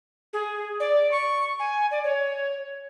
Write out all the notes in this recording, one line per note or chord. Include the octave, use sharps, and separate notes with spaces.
G#4
D5
C#6
G#5
D5
C#5